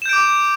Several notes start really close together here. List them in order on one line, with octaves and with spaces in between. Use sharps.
E7 G6 D7 D6